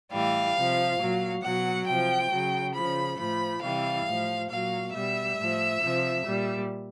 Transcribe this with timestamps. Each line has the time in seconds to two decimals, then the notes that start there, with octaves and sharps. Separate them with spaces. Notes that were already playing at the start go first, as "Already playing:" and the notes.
0.11 A2 E3 G3 F5
0.55 C3 F3
0.99 A#2 F#3
1.43 B2 F#3 F#5
1.87 C3 F3 G5
2.31 C#3 F#3
2.74 C#3 F3 B5
3.18 A2 F3 B5
3.62 C3 E3 G3 F5
4.06 A2 F3
4.50 A#2 F#3 F5
4.93 B2 G3 E5
5.37 A2 F3
5.81 C3 F3
6.25 A#2 G3